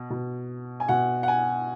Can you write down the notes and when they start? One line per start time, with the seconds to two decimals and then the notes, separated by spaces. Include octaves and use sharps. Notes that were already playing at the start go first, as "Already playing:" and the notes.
Already playing: B2
0.10 B2
0.80 G#5
0.88 B2 F#5
1.23 F#5
1.28 G#5